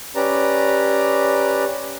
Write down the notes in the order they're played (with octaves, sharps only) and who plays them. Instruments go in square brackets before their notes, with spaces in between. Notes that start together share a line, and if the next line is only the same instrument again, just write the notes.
[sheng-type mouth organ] C#4 G4 B4 D5 A#5